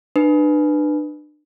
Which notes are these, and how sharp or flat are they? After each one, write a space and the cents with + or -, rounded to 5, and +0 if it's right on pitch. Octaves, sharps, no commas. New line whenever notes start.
D4 +35 B4 +0